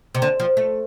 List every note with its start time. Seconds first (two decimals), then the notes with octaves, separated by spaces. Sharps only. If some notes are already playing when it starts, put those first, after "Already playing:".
0.15 C3
0.22 D3
0.40 F3
0.57 A3